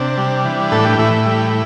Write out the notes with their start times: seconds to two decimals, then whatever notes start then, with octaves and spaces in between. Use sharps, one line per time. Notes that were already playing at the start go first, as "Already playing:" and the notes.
Already playing: C3 D4
0.18 G3
0.45 E3
0.72 A2 A4
0.85 G4
0.99 A2 E4
1.26 G3